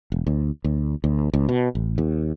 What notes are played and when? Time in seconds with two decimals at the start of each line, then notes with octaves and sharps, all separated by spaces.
0.12 E1
0.27 D2
0.64 D2
1.04 D2
1.34 C#2
1.49 B2
1.75 A1
1.98 D#2